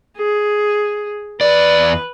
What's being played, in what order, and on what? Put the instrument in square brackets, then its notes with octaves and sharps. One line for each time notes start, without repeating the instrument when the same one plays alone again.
[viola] G#4
[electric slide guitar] E2 D5 [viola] B4